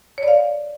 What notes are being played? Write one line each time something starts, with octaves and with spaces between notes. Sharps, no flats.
C#5 D5 F5